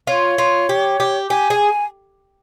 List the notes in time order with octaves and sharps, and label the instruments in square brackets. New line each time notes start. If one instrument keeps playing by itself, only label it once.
[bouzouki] F4 [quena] C#5
[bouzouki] F4
G4
G4
[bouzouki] G4 [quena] G#5
[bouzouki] G#4